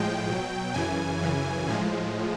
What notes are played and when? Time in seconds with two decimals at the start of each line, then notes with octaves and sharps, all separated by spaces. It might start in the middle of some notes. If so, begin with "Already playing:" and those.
Already playing: A2 F3 G#3 G5
0.28 B2 F#3
0.74 F#2 C#3 E3 G#5
1.21 F#2 C#3 E3
1.68 A2 F3 G#3